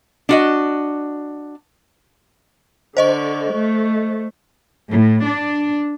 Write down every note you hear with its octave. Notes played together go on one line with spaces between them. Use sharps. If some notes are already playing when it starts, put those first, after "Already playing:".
D4 F#4 D#5
D3 C5 D#5 C#6
A3
A2
D4